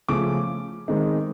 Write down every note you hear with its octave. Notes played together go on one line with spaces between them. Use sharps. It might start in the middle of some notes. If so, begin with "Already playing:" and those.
C#3 F3 A3 C#4 D6
D#3 G#3 C4 D#4